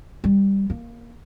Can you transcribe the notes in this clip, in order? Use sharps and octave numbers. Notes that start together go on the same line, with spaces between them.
G3
A#3